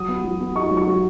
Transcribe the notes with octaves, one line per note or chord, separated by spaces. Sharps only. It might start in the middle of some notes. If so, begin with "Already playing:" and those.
Already playing: F#3 D#6
B3
F#3
B3
D#4 C#6
F#3
C#6
F#3